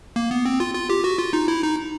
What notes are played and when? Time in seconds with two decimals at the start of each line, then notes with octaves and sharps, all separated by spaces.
0.16 A#3
0.31 B3
0.45 C4
0.60 F4
0.74 F4
0.90 G4
1.04 F#4
1.19 F4
1.33 D#4
1.48 E4
1.62 D#4